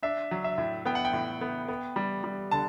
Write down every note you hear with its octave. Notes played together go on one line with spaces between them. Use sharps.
D4 E5
F#3
E5
A2
B3 G5
F#5
G5
A2
B3
B3
G3
G3
D3 A5